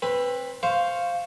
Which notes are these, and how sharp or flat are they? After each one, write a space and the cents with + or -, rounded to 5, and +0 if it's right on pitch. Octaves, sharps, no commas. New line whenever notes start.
C4 +25 B4 +0
C5 +0 F5 +0 C#6 -5